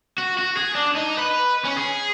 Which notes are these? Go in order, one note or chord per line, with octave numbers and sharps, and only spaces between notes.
F#4
F#4
G#4
D4
D#4
B4
C#4
G#4